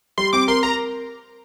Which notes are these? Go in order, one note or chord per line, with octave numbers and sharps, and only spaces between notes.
G3 C6
C4 D6
A#4 C6
A#4 A#5